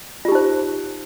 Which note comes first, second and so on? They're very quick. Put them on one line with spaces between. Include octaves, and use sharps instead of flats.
F4 G4 D#4 C5